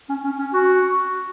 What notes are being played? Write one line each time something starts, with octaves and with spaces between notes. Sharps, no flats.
C#4
C#4
C#4
F#4